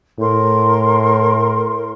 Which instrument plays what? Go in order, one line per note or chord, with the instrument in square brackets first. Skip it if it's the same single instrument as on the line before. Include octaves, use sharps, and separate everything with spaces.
[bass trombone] A2 [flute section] A#4 C6